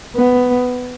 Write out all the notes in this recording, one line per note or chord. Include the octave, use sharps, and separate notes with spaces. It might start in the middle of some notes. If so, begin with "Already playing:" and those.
B3